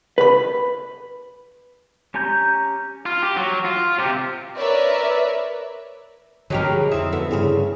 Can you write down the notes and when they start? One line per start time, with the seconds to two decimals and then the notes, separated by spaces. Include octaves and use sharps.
0.18 B4 B5
2.14 C#4 G4 G#5 A#5 G6
3.06 F4
3.22 G4
3.37 F#3
3.65 F4
3.99 C3 G4
4.57 A#4 B4 C#5 D5 E5
6.50 B2 D3 F3 F#3 D#4 G4 G#4 A#4
6.92 F2 C4 E4 E5 D#6
7.13 B3 A4
7.31 G2 C#3 E4 G#4